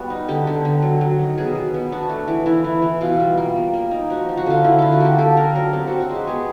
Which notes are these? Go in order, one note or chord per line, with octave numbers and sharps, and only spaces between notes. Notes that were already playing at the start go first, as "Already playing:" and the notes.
Already playing: G3 B3 F#4
D#4
D3 G4
D3
D3
F#3
F#3
D#3
B2 G#4
B2
B3
D4 F#4
A3
E3
E3 E4
E3
E3
B2 F4
G3
A#3
G3
A#3
D#4
F3 F#4
F3
F#4
D3 F4
D3 E4
D3 F4
F#4
A#3 G4
A#3 A4
D4 A#4
F#3 A#4
C4 G4
C4 F#4
F#4
G#3
G4
B3 G#4